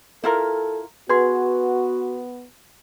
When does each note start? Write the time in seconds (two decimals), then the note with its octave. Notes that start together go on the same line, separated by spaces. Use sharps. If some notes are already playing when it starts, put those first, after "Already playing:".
0.24 E4 F4 A4 A#4
1.09 B3 F#4 G#4 B4 C6